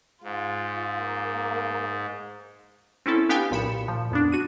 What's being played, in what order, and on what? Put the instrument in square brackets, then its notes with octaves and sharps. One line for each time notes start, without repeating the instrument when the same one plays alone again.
[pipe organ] G#2 [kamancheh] F4
[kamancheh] A#3
[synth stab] C4 C#4 E4 A4
B3 D4 G4 F5 G5 G#5
B1 A#2 B5 C#7 E7
A#2 F3
F2 B3 D4
F#4 D#7